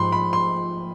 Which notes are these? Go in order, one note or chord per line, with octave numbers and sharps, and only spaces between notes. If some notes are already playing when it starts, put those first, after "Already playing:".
Already playing: G#2 F3 G#3 B5 C6
B5
C6